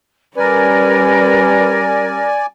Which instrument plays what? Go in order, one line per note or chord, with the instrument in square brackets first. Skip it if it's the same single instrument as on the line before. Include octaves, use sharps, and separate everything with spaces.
[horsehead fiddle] G3 C#4 [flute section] A#4 [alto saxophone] B4 [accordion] D5 G#5